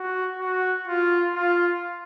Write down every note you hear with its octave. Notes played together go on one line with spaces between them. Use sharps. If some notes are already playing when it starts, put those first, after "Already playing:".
Already playing: F#4
F#4
F4
F4